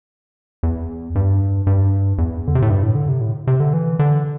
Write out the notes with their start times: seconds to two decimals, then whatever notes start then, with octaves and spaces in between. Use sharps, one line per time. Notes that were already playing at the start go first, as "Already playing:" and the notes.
0.63 E2
1.15 G2
1.67 G2
2.18 E2
2.48 D3
2.55 C3
2.62 A2
2.70 G2
2.83 A2
2.95 D3
3.09 C3
3.21 A2
3.47 C3
3.60 D3
3.73 E3
3.99 D3